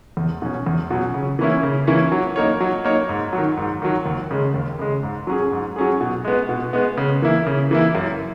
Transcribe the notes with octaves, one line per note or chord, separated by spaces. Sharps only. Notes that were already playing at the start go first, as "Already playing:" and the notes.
E2
B2 F#3 C#4
E2
B2 F#3 C#4
C#3
E3 A#3 C#4 E4
C#3
E3 A#3 C#4 E4
F#3
A#3 D#4 A#4 C#5
F#3
A#3 D#4 A#4 C#5
G#2
D#3 F#3
G#2
D#3 F#3
D#2
C#3 G#3
D#2
C#3 G#3
G#2
F#3 C#4 G#4
G#2
F#3 C#4 G#4
B2
G#3 B3
B2
G#3 B3
C#3
E3 A#3 E4
C#3
E3 A#3 E4
F#2